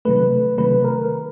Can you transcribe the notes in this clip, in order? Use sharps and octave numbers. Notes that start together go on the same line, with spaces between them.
C3 D#3 F#3 A3 B4
C3 D#3 F#3 A3 B4
A#4